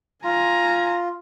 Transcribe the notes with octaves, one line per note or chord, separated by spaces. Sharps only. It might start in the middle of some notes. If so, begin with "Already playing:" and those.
F4 G#5 A#5